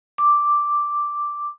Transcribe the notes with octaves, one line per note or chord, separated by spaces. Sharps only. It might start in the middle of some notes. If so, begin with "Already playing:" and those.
D6